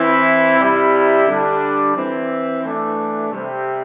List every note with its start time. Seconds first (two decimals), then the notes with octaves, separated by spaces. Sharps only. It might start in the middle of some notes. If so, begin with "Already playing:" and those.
Already playing: E3 C4 E4
0.59 C3 G3 E4
1.26 D3 G3 D4
1.95 E3 C4 E4
2.63 E3 A3 D4
3.31 C3 G3 C4